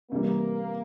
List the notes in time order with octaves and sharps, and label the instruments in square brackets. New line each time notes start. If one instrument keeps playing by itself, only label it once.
[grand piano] C3 E3 G3 [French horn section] A#3